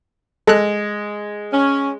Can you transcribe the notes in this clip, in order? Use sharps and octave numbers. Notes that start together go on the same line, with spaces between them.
G#3 A4 F#6
C#4